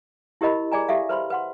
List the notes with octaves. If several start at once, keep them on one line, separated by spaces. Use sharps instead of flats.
E4 G4 A#4 D#5 B5
G#4 D5 G#5 A#5
G4 A4 E5 F5
B4 C5 B5 C6
B4 F#5 C6